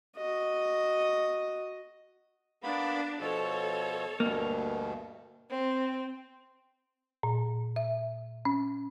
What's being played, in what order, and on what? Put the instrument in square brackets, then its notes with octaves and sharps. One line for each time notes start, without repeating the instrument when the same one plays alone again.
[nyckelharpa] F#4 D#5
[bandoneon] A#3 B3 B5 [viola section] D4
[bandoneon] B2 F3 [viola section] A4 C#5
[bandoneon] D2 G2 B2 [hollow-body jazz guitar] A#3
[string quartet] C4
[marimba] A#2
E5
C#4